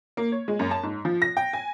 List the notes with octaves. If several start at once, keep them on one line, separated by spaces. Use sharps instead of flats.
A#3
C#5
G#3
F#2
A5
G#2
F3
A#6
G5
G#5